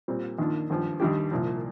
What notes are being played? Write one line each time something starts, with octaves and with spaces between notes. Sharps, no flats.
A#2 G3 C4
D#2 D#3 A#3 D4 F4
G#1 G2 F3
D#2 D#3 G3 D4 G4
C2 A#2 F3